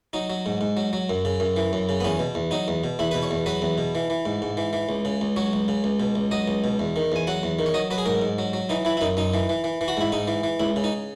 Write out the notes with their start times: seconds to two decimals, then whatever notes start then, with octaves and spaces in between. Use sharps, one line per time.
0.13 F#3 D#4
0.30 F#3
0.46 G#2
0.61 G#2
0.77 F#3
0.93 F#3
1.09 F#2
1.25 C#3
1.40 F#2
1.56 E3
1.73 F#2
1.89 C#3
2.00 B3
2.04 E2 C#4
2.19 B2
2.35 E2
2.51 F#3 D#4
2.68 E2
2.84 B2
2.99 E2 E4
3.11 B2 B4
3.23 C#5
3.31 E2
3.46 F#3 B4
3.62 E2
3.78 B2
3.95 E3
4.10 E3
4.26 G#2
4.42 G#2
4.57 E3
4.73 E3
4.89 C#2
5.05 C#3
5.21 C#2
5.36 F#3 C#5
5.53 C#2
5.68 C#3
5.84 C#2
6.00 B2
6.15 C#2
6.31 F#3 D#5
6.48 C#2
6.64 B2
6.79 E2
6.96 D#3
7.12 E2 G#5
7.27 F#3 F#5
7.43 E2
7.59 D#3
7.66 C#5
7.74 F#3 D#5
7.91 F#3 B4
7.98 G#4
8.06 G#2 A#4
8.21 G#2
8.39 F#3
8.53 F#3
8.69 E3 D#4
8.85 E3 E4
8.97 E4
9.01 F#2 D#4
9.17 F#2 D#4
9.34 E3
9.49 E3
9.64 E3
9.81 E3
9.88 F#4
9.97 G#2 E4
10.12 G#2 D#4
10.27 E3
10.43 E3
10.60 C#2 E4
10.76 C#3
10.84 D#4